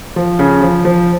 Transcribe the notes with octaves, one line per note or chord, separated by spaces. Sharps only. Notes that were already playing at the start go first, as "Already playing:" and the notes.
F3
C#3
F3
F3